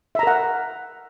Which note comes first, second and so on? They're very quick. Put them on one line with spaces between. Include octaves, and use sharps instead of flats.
E5 A#5 A#4 F#5